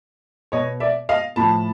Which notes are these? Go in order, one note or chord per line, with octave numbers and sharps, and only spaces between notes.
B2 C#5 D#5
D5 E5
D#5 F5
A2 F3 A5 B5